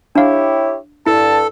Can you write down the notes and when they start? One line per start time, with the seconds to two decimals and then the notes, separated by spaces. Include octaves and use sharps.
0.16 D4 E4 G4 C#5 F5
1.06 G2 E4 A4 A5